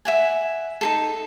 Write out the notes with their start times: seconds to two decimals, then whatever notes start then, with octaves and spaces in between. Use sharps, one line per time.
0.05 E5 F#5 G#5
0.81 D#4 G#4 A4